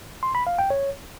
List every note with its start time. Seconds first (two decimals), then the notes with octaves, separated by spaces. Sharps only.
0.23 C6
0.35 B5
0.47 F5
0.59 G5
0.70 C#5